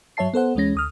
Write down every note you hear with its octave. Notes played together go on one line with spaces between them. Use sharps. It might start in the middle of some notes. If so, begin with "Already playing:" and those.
G2 F#3 C#5 E5 A5 C7
B3 A4 C5 F#5
D2 E3 G#3 C#4 A#6
D2 D#6 F6